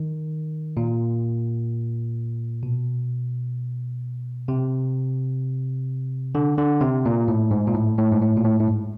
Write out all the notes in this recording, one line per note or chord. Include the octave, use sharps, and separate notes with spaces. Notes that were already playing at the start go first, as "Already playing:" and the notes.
Already playing: D#3
A#2
B2
C3
D3
D3
C3
A#2
A2
G#2
A#2
A2
A2
G#2
A2
A#2
A2
A2
G#2